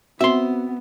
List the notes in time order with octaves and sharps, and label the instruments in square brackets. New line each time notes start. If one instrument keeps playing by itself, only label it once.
[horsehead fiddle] B3 [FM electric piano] C4 F#4 [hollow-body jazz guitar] E5 C6